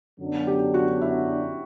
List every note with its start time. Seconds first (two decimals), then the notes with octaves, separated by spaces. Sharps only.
0.20 F#2 D3 F#3 B3 D4
0.47 G4
0.74 F#4
1.01 E4